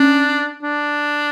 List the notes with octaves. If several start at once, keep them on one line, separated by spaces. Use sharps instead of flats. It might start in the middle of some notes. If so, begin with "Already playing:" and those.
Already playing: C#4 D4
D4